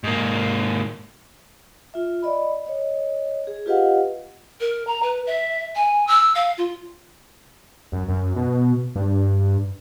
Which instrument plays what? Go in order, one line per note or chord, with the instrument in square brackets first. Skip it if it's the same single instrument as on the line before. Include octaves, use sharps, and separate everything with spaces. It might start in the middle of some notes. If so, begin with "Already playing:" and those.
[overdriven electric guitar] G#2 A#3
[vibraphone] F4 E5
D5 D#5 B5
C#5 D#5
G#4
F4 G4 B4 D#5 F5 F#5
[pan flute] A#4
A#5
B4
E5
G#5
E6
F5
F4
[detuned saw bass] F#2
F#2
B2
G2